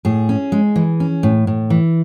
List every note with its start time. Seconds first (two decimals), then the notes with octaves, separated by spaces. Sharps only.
0.05 A2 G#4
0.29 C#4
0.52 G#3
0.76 E3
1.00 C#4
1.23 A2
1.47 A2
1.70 E3